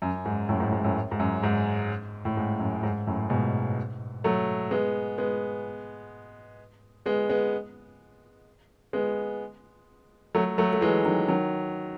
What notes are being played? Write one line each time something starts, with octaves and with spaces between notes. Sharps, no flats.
F#2
G#2
F#2 A2
G#2
G#2
F#2 A2
G#2
F#2
G#2
A2
G#2
F#2
G#2
F#2 A2
G#2 B2
F#3 A3
G#3 B3
G#3 B3
G#3 B3
G#3 B3
G#3 B3
F#3 A3
F#3 A3
A3
E3 G#3
D#3 F#3
D#3 F#3